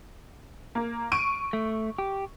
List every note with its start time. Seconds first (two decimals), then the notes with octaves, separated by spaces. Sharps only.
0.75 A#3
1.12 C#6 D7 D#7
1.53 A3
1.98 G4